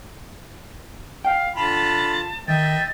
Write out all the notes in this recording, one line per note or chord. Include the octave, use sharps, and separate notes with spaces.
F5 G5
D3 F4 A5 B5
D#3 D#5 E5 G5 A6